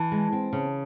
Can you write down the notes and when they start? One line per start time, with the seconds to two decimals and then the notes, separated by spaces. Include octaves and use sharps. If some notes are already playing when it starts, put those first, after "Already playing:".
Already playing: E3 A5
0.12 G#3
0.32 C4
0.53 C#3